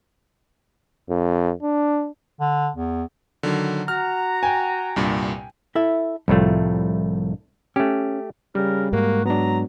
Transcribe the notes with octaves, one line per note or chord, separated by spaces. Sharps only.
F2
D4
D3
E2
D3 D#3 F#3
F#4 F#5 A#5 F6
G5 G#5
C2 G2 A#2
E4 A4 E5
C2 A2 F3 G3 A3 F4
A3 C#4 G4
C#3 G3 A#4
G#2 A#3 F#4
F#3 B3 D4 A#5